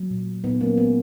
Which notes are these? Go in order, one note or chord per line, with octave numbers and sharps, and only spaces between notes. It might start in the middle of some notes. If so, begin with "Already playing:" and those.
Already playing: F#3
A#2
A#3
A#2 B3 D#4
F#3 A#3 C#4
G#3 B3